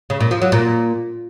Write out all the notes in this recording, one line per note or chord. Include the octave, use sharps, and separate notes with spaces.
C#3
A#2
F3
F#3
A#2